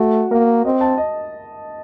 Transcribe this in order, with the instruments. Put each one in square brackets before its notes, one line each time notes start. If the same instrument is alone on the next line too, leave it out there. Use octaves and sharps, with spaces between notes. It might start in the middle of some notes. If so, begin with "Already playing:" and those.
Already playing: [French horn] A3 [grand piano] F#4
[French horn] A#3 [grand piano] A#4
[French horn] C4 [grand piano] D#5
[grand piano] A5
D#5